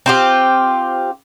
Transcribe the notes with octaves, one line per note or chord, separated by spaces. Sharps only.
C4 F4 G4